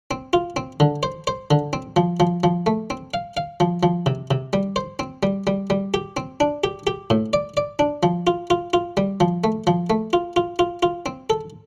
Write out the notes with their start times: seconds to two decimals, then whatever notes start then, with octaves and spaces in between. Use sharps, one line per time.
0.11 C4
0.33 F4
0.56 C4
0.80 D3
1.03 C5
1.27 C5
1.51 D3
1.73 C4
1.96 F3
2.20 F3
2.44 F3
2.66 A3
2.90 C4
3.14 F5
3.37 F5
3.60 F3
3.83 F3
4.06 C3
4.31 C3
4.53 G3
4.76 C5
4.99 C4
5.23 G3
5.47 G3
5.70 G3
5.94 G4
6.17 C4
6.40 D4
6.64 G4
6.87 G4
7.10 A2
7.33 D5
7.57 D5
7.79 D4
8.03 F3
8.27 F4
8.50 F4
8.73 F4
8.97 G3
9.20 F3
9.44 A3
9.67 F3
9.90 A3
10.13 F4
10.36 F4
10.59 F4
10.83 F4
11.06 C4
11.30 A4